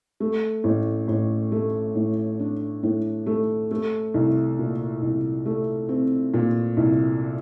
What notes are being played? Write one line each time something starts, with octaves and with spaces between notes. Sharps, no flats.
A3
A1
A1
A3
A2
D4
A2
A3
A3
C2
A#2
C2
A3
C4
A#2
C2